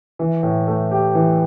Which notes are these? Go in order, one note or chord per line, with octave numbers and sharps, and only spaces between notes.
E3
A2
A3
G4
E3